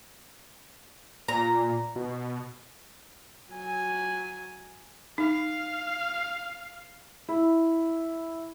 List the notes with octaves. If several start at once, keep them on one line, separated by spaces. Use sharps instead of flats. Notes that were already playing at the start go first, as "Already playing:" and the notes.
A#2 A#5
B2
F#3 G#5
D#4 F5
E4